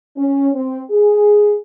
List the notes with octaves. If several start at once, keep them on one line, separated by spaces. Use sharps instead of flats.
C#4
C4
G#4